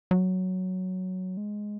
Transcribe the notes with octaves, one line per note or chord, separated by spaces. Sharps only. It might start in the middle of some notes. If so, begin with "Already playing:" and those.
F#3
G#3